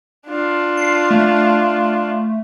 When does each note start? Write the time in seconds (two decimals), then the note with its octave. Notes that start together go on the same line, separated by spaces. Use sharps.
0.26 D4 F4
0.77 C7
1.11 A3